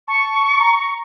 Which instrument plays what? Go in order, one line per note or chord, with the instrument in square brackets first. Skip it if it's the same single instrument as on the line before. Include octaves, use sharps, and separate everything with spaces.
[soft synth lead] A5 [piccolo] C#6
[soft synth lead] A#5